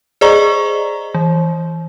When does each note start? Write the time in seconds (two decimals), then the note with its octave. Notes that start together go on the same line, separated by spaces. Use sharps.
0.21 G#4 C5 D5 D#5 A#5 C#6
1.14 E3